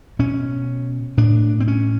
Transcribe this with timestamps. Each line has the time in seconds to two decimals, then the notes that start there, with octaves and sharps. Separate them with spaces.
0.19 B2 C#4
1.17 A2 D4
1.60 C4
1.68 C#4